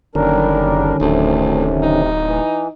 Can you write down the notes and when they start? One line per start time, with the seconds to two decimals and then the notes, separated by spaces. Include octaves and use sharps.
0.15 F#1 D3 D#3 G3 C#4 D4 A#4
1.01 D1 D2 C3
1.83 D#4
2.27 E3